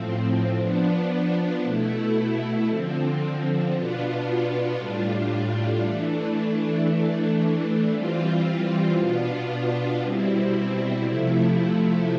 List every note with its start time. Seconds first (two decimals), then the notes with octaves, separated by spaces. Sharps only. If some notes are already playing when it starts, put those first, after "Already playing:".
Already playing: A2 F3 C4
0.59 F3 B3 D4
1.64 B2 A3 E4
2.69 D3 F3 C4
3.73 B2 B3 D4 F4
4.78 A2 G3 D4 F4
5.82 E3 A3 D4
6.88 E3 A3 D4
7.93 E3 G3 C4 F4
8.97 B2 B3 D4 F4
10.01 B2 G3 C4 E4
11.06 C3 F3 A3 E4